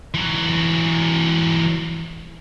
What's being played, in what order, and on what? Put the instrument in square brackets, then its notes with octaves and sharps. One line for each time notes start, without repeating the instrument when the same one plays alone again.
[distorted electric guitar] E3 F#3